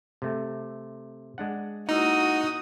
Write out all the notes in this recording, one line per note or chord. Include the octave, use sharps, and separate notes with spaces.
C3 A3
G#3 D4 F#5
A#3 D#4 E4 F#4 D#6